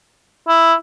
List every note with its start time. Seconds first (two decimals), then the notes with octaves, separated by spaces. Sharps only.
0.48 E4